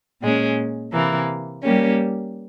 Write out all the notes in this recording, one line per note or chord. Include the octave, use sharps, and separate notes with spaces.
A#2 G#3 C#4
C3 E3 A#3
G3 A#3 C#4 G4